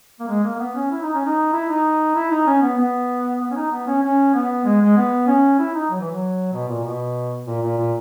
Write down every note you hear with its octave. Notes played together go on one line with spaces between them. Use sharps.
A#3
G#3
A#3
A#3
B3
C#4
E4
D#4
C#4
D#4
E4
D#4
E4
D#4
C#4
B3
B3
B3
C#4
D#4
B3
C#4
C#4
B3
G#3
G#3
B3
C#4
E4
D#4
F#3
E3
F#3
B2
A#2
B2
A#2
A#2
A#2